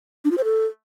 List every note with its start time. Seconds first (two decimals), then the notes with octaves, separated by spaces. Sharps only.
0.25 D4
0.31 F4
0.38 C5
0.44 A4